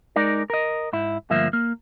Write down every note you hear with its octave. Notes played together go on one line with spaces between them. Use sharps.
G#3 D#4 A#4 D5
A#4 D#5
G#2 E4
D2 G2 F3 A#3 E5
A#3